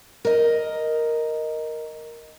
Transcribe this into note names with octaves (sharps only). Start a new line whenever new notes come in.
A#4 D#5